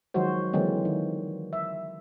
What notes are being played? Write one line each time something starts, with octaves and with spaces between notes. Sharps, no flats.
D#3 F3 F#3 G#3 F#4 C5
D3 E3 F#3 G#3 A#3 C4
D#3
E5